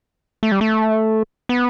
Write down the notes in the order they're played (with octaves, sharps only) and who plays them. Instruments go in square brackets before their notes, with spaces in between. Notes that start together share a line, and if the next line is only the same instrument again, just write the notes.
[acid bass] A3
G3
A3
B3